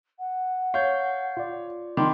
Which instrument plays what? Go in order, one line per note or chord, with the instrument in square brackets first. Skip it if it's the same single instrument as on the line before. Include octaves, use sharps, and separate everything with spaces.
[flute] F#5
[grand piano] C#5 [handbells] F5 G6
[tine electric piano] F4 D5
[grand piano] D#3 [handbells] B5 D6 [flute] C6